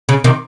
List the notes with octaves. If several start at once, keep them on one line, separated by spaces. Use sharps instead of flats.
C#3
C3 D#3